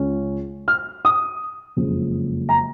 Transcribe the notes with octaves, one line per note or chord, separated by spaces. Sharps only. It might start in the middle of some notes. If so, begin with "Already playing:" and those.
Already playing: C#2 C#3 G#3 C#4
F6
D#6
F#1 F2 C#3 G#3
A#5